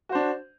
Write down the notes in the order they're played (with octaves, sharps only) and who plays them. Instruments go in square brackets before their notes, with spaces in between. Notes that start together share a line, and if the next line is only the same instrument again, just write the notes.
[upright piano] F#4
C5
D4